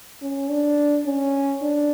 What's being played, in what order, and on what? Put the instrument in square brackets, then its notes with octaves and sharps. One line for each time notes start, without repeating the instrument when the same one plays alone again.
[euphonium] C#4
D4
C#4
D4